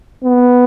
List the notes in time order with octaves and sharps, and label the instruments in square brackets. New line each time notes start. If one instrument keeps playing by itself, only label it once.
[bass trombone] B3